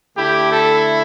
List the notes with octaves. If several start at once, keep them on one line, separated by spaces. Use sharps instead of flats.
D3 A3 E4 G4
A4